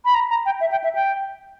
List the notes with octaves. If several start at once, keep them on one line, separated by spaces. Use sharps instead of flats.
B5
A#5
A#5
G5
E5
G5
E5
G5